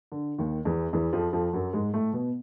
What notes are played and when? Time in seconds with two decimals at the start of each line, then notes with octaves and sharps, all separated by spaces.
0.12 D3
0.39 D#2 D#3
0.65 E2 E3
0.93 E2 E3
1.13 F2 F3
1.33 F2 F3
1.53 F#2 F#3
1.73 G#2 G#3
1.94 A2 A3
2.13 B2 B3